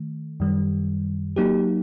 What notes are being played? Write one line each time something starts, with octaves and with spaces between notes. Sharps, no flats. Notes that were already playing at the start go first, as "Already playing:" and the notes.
Already playing: D#3 A3
F#2 D#3 G3
F#3 A#3 D#4 G4